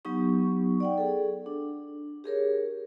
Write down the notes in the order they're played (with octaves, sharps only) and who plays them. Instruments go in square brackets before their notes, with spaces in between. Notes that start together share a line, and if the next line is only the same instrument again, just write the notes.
[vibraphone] F#3 B3 D#4 G4 C#6
D5 F#5 G5
G#4 A4
D4
G4 G#4 A#4 C#5